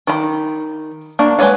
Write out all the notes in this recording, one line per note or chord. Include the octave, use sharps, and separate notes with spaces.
D#3 B5
A#3 D4 F#4 A5
G#3 G#4 B4 C#5 F#5